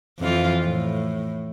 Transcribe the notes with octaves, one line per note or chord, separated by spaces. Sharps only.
F2 E3 F4
A2